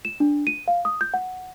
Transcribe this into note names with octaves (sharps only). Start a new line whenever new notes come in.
E7
D4
D#7
F5
D#6
G6
F#5